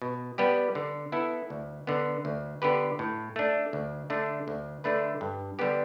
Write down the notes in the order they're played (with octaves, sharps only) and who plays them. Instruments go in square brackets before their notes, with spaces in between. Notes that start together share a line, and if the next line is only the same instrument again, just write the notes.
[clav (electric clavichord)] B2
G3 B3 G4 B4
D3
B3 E4 A4
D2
D3 B3
D2
D3 B3 G4 B4
A2
A3 D4
D2
D3 A3 D4
D2
D3 A3 D4 B4
G2
D3 G3 B3 G4